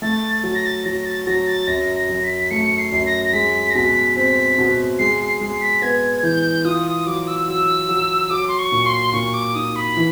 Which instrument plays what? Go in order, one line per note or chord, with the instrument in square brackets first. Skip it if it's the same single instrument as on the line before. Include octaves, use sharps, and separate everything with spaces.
[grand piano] A3 [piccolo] A6
[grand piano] F#3 [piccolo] A6
[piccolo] A#6
A6
[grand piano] F#3 [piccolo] A#6
[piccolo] A6
[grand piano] F#3 [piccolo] A#6
[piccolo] A6
[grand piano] F#2 [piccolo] A#6
[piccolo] A#6
[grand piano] F#2
[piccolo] B6
[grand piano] A3 [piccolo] C#7
[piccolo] C7
[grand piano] F#2
[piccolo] A#6
A#6
[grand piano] G#3 [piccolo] B6
[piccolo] A#6
[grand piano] B2 [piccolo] B6
[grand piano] C4 [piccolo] B6
[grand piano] B2
[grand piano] G#3 [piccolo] C7
[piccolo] C7
[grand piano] G#3 [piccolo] C7
[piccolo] B6
[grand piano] B3 [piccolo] G#6
[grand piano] E3 [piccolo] G6
[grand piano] F4 [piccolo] D#6
[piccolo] D#6
[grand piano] F#3 [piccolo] D6
[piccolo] E6
[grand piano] F#3 [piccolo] E6
[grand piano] F#3
[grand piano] F#3 [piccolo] D6
[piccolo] C6
C#6
[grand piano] A#2
[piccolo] C6
[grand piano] A#2 [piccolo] C#6
[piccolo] D6
[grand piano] D#4 [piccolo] D#6
[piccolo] B5
[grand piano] E3